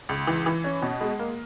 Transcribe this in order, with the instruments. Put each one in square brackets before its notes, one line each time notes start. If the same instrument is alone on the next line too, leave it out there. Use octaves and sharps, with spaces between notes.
[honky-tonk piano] C#2
E3
E3
C#4
B2
G#3
A#3